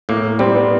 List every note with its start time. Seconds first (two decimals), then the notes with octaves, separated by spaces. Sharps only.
0.09 A2 A#3
0.39 G3 C4
0.55 B3